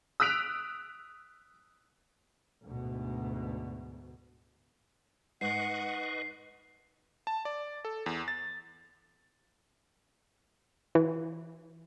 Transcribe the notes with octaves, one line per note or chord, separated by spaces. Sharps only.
D#6 E6 F#6 B6 D7 F7
D2 G#2 B2
G#2 B4 D#5 F#5 C#6 C7
A5
D5
A4
E2
A6
E3